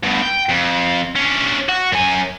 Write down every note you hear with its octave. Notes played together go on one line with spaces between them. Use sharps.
G2 B2
G5
F2
C#4 D4
F#4
F#2 G#5